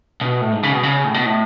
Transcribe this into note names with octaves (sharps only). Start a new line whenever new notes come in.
B2
A2
G#2
C#3
B2
C#3
A2
B2
A2